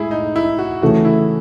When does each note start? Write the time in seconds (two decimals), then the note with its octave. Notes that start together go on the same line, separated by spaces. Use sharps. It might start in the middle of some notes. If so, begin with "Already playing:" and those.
Already playing: A2 G#3 E4 G#4
0.11 D#4
0.36 E4
0.59 F#4
0.82 C#3 E3 A3 C#4 F#4 G#4
1.05 E4